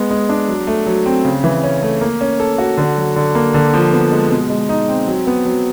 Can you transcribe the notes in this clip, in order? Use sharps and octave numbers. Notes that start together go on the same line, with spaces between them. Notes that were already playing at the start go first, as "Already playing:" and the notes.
Already playing: G#3 B3
G#3
D4
F#3
A3
F#3
C4
C#3
E3
C#4
A3
A#3
C#4
A4
F#4
D3
F#3
D3
A#3
D3
F3
B3
G#3
B2
G#3
D#4
C4
F#3
B3
F#3